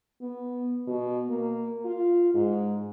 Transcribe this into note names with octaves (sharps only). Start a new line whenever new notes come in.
B3
B2
A#3
F4
G#2